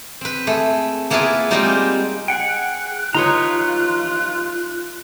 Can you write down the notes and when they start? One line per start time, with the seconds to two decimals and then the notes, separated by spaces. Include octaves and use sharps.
0.21 C4 B4
0.47 A3 G#4
1.10 A#3 B3 E4 F4 G#4 B4
1.50 G3 G#3 A#3 C4 D#4 F4
2.28 G#4 F#5 G5 F#6
3.14 D#4 F4 B4 C#5 A#5 C6 D#6